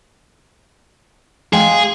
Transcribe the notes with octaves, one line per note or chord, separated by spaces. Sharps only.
G#3 G#4 F5 G5